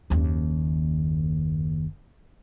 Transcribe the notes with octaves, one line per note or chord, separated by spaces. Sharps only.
F#1 D#2